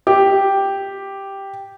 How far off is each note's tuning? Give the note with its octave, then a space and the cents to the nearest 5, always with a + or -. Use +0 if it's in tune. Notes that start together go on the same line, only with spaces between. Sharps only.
G4 +0 G5 +0